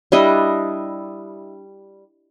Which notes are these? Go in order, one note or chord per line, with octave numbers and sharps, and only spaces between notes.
G3 D4 E4 D#5